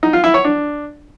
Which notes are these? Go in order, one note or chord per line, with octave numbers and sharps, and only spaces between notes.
D#4
F4
E4
C#5
D4